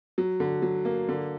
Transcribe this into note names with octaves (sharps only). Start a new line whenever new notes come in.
F#3
D3
F#3
A#3
D3